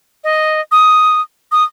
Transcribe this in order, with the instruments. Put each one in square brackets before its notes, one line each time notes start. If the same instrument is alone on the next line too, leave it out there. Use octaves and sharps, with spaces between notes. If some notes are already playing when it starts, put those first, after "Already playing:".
[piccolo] D#5
D#6
D#6